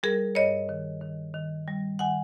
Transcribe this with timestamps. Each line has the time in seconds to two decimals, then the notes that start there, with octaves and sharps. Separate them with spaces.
0.03 G3 G#4 A#4
0.35 G2 C#5 D#5
0.69 D#3
1.01 D#3
1.34 D#3
1.68 G3
1.99 D#3 F#5 G#5